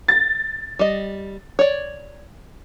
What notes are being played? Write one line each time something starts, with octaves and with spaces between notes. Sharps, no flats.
A6
G3 D#5
C#5 D5